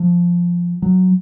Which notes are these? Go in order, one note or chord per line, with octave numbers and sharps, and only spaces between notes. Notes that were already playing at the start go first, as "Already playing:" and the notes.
Already playing: F3
F#3